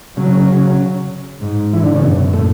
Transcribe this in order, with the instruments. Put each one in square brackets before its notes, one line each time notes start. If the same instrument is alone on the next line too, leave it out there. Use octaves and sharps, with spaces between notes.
[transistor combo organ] C#3 [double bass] F#3
[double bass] G#2
[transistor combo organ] E3
D3
C#3
[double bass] F#2 [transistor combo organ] B2
[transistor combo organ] A2